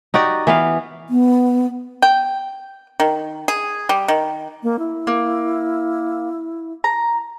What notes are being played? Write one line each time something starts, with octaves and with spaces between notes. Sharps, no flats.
D#4 F#4 G4 D5
E3 B3 F5
B3
G5
D#3
G#4
G3
D#3
A#3
E4
A#3
A#5